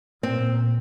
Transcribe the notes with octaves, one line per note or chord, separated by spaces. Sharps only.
A#2 C4